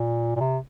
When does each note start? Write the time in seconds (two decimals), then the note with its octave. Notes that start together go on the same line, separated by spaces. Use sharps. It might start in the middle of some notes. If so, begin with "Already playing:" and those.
Already playing: A#2
0.36 A#2
0.40 C3